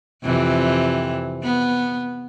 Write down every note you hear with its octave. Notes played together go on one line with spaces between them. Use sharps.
F2 C3 E3
B3